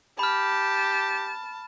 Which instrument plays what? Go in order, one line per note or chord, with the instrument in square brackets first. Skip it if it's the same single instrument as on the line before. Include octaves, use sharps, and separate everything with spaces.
[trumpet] G4 [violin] A5 [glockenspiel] B5 F6